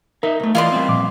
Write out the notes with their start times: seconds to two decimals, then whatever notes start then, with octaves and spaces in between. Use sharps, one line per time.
0.23 D#4 A#4 E5
0.40 C2 A3
0.55 E3 F4 D5 D#5 C6
0.72 G3 C4
0.88 A#2 F3 D6